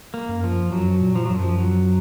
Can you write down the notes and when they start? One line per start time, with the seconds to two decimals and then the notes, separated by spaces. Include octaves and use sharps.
0.14 A#3
0.29 F#2
0.44 F3
0.72 F#2 F#3
1.01 A#2
1.15 F3
1.26 F#3
1.30 F#2
1.35 F3
1.58 F#3